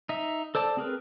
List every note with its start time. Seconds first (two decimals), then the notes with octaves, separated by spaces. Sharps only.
0.09 D#4 E5
0.55 A4 C5 D5 A5
0.77 C4 G#4 A#4 B4